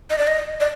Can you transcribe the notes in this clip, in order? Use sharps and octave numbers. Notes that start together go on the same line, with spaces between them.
D#5
D5
D#5
D5